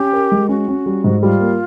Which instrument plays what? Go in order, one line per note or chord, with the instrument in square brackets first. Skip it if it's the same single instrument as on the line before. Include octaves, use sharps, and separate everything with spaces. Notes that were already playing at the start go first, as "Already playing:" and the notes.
Already playing: [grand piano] C#4 [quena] G4
[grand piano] A#4
G#3
[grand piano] C#4 [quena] F#4
[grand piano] C#4
G3
G#2
[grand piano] G3 [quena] F4
[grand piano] A#3